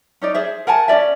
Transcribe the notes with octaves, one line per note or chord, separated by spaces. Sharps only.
C#4 D#4 D5
G#4 C5 E5
A#4 F#5 G#5 A5
C#4 F4 D5 E5